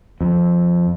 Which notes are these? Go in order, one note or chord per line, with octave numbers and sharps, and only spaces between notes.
F2